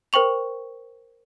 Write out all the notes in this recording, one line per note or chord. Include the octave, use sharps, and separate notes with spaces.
A#4 C5 G5 C#6 F7